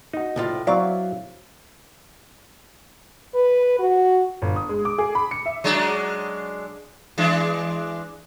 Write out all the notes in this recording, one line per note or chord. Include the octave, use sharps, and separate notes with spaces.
D#4 F#4
C2 A2 F4
F#3 C4 E4 D5 F5
B4
F#4
G1
D#6
G#3
D6
G#4
B5
C#7
E5
F#3 G#3 D4
E3 G#3 D4